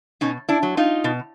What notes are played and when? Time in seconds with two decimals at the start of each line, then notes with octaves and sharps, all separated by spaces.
0.21 B2 C#4 D#4
0.49 D4 E4
0.63 F#3
0.77 D#4 F4
1.04 B2